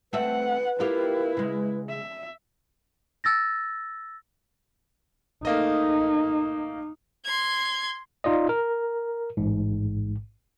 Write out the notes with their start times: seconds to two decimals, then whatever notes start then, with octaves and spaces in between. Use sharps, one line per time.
0.13 A3 C4 B4 E5 F#5
0.80 A#3 E4 F4 G4
1.37 C#3 G#3
1.89 E5
3.24 E6 A6 A#6
5.45 A3 A#3 D#4 D#5
7.25 C6 G#6
8.24 D#4 F4 D5 D#5
8.49 A#4
9.37 A1 G#2